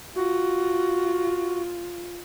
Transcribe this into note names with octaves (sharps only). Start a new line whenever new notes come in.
F4 F#4